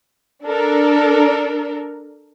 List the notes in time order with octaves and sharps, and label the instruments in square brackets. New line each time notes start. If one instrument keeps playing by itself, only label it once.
[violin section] D4 A4 A#4